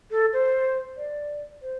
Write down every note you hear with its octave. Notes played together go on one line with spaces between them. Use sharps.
A4
C5
D5
C5